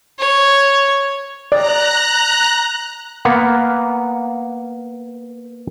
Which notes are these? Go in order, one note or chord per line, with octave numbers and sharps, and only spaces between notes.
C#5
D5 A#5 F#6
A#3 B3 F5 F#5